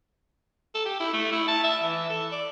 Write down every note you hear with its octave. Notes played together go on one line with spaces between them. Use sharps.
A4
G4
E4
A3
E4
A5
E5
E3
A4
D5